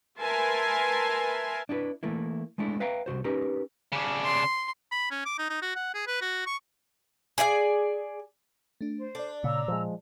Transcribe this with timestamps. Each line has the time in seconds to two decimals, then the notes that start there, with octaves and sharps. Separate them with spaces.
0.20 A#4 B4 E5 G#5 A5 C6
1.69 D4 E4 G4 B4
2.03 E3 A3 A#3 E4
2.58 G#3 A3 D4 E4
2.80 B4 E5 F5 G5 A#5
3.06 C2 B2 F#4 C5
3.24 C#4 D#4 G4 A#4 B4
3.93 C#3 D4
4.24 C6
4.91 B5
5.11 C#4
5.25 D6
5.38 D#4
5.49 D#4
5.62 F#4
5.75 F#5
5.94 G#4
6.07 B4
6.21 F#4
6.46 C#6
7.38 G#4 D5 E5 G#5
8.81 A3 D4
8.98 C5
9.15 D4 A4 D5
9.44 A#2 C#3 A#5 E6
9.68 F3 G#3